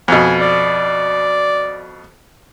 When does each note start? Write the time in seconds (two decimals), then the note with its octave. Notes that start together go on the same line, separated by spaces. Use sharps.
0.08 F2 B2 G#5
0.41 D5